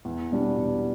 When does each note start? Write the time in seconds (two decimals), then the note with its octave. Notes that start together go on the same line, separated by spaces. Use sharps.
0.05 E2
0.31 B2 G3 D4
0.58 E2